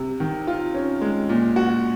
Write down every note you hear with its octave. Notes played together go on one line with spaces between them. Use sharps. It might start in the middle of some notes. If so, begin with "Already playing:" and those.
Already playing: C3
D#3
F4
C#4
G#3
A#2
F#4